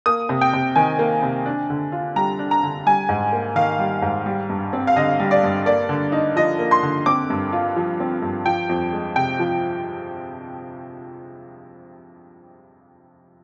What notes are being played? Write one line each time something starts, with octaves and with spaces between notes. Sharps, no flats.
A#3 D#6
C3
G5
C3
D#3 G#5
A#3
C3
D4
D3
F4
G3 A#5
D4
A#5
D3
G3 G#5
G#2
A#3
D#3 F5
G3
G#2
G3
G2
C4
F5
D3 D#5
G3
D5
G2
A#3 D5
D3
D#4
F3 D#5
A#3
C6
D3
C4 D6
G2
F4
F3
C4
G2
F3 G5
F2
G#3
C3 G5
F3